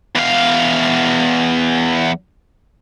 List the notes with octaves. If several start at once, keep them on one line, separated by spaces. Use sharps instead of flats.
E2 F5